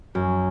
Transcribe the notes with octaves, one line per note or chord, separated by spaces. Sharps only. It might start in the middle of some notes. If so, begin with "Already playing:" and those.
F#2